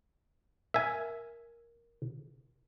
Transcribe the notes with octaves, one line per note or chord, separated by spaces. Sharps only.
A#4 E5 G#5